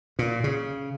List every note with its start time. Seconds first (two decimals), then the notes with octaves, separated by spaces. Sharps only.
0.19 A#2
0.44 C#3